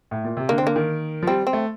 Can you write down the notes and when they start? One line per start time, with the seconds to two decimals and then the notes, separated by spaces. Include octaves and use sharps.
0.11 A2
0.24 A#2
0.37 C3
0.49 D3 A#3
0.58 C4
0.62 D3 A#3
0.76 D#3
1.23 F3
1.27 G3 C4
1.47 C4
1.53 A3